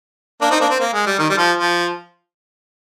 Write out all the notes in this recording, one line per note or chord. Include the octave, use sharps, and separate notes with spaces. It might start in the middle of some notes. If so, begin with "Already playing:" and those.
A#3 D4
C4 D#4
A#3 D4
C4
A#3
G#3
G3
D#3
G3
F3
F3